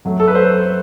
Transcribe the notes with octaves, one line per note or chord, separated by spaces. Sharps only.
F#2 F#3 A3
A4
B4
C5